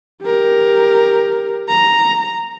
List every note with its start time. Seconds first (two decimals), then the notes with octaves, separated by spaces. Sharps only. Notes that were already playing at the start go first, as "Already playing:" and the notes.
0.23 G4 A#4
1.69 A#5